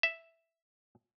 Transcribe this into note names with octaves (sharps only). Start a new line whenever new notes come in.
E5